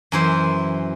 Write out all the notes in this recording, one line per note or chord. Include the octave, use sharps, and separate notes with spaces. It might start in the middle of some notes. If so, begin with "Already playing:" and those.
F#2 E3 C5